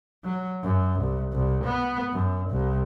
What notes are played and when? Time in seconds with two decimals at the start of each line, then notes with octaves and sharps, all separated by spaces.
0.25 F#3
0.63 F#2
1.00 C2
1.32 C2
1.64 B3
2.13 F#2
2.50 C2